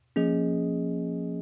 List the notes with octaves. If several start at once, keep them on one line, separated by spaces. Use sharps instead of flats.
F3 A#3 C#4 G#4 D#5